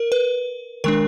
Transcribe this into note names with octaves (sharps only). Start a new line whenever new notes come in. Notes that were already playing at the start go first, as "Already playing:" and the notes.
Already playing: A#4
B4
D#3 G#3 D4 A#4